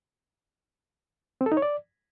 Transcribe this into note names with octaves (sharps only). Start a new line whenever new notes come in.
C4
A4
D#4
C#5
D5